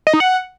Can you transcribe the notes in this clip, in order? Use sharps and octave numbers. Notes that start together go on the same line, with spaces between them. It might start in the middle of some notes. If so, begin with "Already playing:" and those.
D#5
D#4
F#5